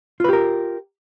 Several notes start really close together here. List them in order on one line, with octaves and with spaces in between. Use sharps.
F4 B4 G4 A#4